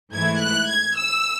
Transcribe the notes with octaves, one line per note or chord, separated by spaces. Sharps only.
G#2 E3 A3 E4 G#6
F#6
G#6
E6